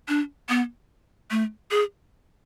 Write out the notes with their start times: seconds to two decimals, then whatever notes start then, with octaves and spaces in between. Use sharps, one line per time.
0.08 D4
0.49 B3
1.31 A3
1.71 G#4